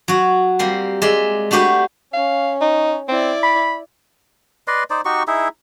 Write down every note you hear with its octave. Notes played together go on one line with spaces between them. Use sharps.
F#3 F#4
G3 A#3 C4
G#3 D5 E5
A3 D4 F#4 G4 B4
C#4 F5
D#4
C4 E4 D5
B5
B4 D5 D#5 C6
D#4 C5 D5
D#4 F#4 G4 C#6
D#4 E4 G#4 E5